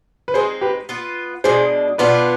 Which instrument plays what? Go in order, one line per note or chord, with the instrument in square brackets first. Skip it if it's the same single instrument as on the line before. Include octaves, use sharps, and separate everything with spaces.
[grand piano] B4
[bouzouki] G#3 C4 D#4 [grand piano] G#4 C5
[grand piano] G4 B4
[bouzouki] B3 F4 B4
[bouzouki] B2 G#3 D4 [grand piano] G#4 C5
[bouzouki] B2 B3 D4 F4 [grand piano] B4 D5